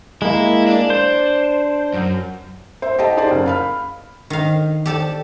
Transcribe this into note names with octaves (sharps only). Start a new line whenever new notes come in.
G#3 A#3 E4
D4
C5
F#2
C5 E5
G4 A4 D#5 A5
D#4 G#4 C5 D5
F#1
F5 B5 F6
D#3 F5
G4 A4 D5 A5